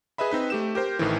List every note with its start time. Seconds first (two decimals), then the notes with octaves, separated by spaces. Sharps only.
0.18 G#4 B4 D#5 E5 B5
0.31 C4 D#4 B4
0.50 A3 G4 E7
0.75 G4 A#4 C5 G5
0.99 A1 A2 D#3 E3